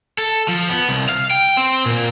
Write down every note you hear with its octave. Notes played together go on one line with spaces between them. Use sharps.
A4
F3
B3
C2
F5
G5
C4
A#2